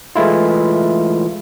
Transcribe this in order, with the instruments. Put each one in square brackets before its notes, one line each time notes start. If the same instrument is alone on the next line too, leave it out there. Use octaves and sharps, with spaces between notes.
[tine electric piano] E3 G#3 A3 E4 F4